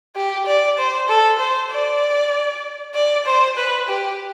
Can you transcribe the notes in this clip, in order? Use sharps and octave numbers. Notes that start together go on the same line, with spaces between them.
G4
D5
C5
A4
C5
D5
D5
C5
B4
G4